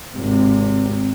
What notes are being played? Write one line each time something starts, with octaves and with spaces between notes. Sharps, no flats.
G#1 C3